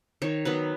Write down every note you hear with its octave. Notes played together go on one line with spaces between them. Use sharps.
D#3 C#5
F#3 B3 B4